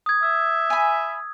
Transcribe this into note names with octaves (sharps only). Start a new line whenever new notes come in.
D#6 G#6
E5 E6
G#5 B5